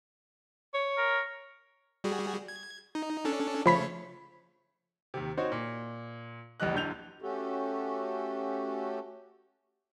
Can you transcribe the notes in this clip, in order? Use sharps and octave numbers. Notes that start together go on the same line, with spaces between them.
C#5
A#4
G3 F#4 G#4
G#6
D#4
C#4 D4 A4
C#3 F3 A3 C#5 B5 B6
D#2 C3
C4 D#4 F#4 C5 C#5
A#2
A#1 E2 G3 D#5 F#6
D1 D3 G6 F7
A3 C#4 F#4 G4 A4